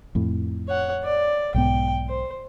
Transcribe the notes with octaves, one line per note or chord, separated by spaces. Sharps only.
F2 A2
C#5 F#5
D5
B1 G#2 B3 G5
C5